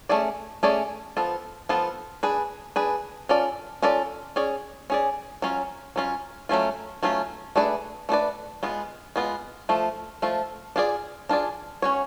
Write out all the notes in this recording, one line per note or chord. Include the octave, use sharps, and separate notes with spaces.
A3 C#4 G#4 D5
A3 C#4 G#4 D5
F3 B3 F4 A4
F3 B3 F4 A4
D4 G#4 B4
D4 G#4 B4
C#4 F4 A4 D5
C#4 F4 A4 D5
C#4 G#4 D5
C#4 G#4 D5
F#3 C#4 F4
F#3 C#4 F4
F#3 A3 C#4 F4
F#3 A3 C#4 F4
A3 D4 G#4 B4 D5
A3 D4 G#4 B4 D5
G#3 B3 F4
G#3 B3 F4
F3 A3 F4
F3 A3 F4
D4 F4 G#4 D5
D4 F4 G#4 D5
C#4 F#4 C#5